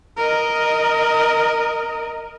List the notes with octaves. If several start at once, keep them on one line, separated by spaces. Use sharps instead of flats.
A#4 D#5